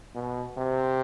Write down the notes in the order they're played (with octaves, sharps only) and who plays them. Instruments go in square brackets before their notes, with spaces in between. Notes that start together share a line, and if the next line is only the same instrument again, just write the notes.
[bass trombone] B2
C3